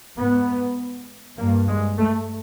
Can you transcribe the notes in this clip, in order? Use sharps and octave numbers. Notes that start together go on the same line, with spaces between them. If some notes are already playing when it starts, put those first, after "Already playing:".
G#2 B3
G2 A#3
G#3
A3